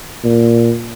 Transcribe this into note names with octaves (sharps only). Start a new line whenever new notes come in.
A#2